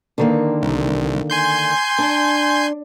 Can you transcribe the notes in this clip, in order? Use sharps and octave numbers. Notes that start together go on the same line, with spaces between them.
D3 D#3 A#3
C2
G#5 C6 G6
D4